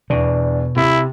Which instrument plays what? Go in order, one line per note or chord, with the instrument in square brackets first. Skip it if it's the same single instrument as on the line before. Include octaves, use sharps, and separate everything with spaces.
[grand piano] E2 D4 [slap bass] B2
[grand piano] C3 [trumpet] E4